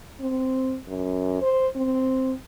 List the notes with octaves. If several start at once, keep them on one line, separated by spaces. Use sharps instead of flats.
C4
F#2
C5
C4